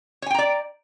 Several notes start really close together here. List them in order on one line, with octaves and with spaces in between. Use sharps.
C#5 G#5 G5 A#5 D5